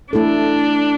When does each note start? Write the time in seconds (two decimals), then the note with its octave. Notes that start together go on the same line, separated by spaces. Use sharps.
0.13 A3 D4 E4 A4